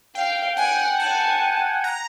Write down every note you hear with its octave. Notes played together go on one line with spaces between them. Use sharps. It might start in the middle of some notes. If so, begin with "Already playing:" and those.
F5 G5
F#5 G#5
G#5 A5
A#5